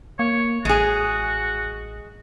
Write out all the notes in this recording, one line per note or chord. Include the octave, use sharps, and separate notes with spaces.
A#3 C#5
A1 G#3 F#4 G#4